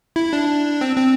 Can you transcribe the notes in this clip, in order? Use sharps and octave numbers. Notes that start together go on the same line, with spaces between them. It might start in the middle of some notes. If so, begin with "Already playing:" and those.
E4
D4
C4
C4